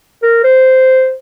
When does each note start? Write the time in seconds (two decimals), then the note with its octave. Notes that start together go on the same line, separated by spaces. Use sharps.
0.23 A#4
0.44 C5